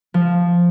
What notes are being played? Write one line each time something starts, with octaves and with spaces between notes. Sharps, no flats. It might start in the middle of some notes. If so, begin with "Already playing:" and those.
F3